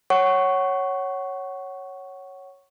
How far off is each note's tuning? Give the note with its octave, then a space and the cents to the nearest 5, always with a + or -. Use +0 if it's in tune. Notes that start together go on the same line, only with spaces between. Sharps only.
C#5 -5 F#5 +20 C#6 +0